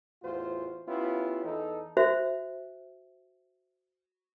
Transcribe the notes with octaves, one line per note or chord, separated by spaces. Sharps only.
E2 A2 F4 F#4 C5
B3 C#4 E4 F4 G4
E2 E3 D#4 A4
F#4 C5 E5